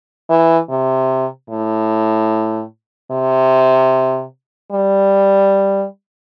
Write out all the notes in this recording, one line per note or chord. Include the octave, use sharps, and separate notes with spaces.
E3
C3
A2
C3
G3